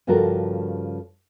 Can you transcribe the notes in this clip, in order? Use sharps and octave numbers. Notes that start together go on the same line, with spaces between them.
G2 C#3 F3 F#4 A4 A#4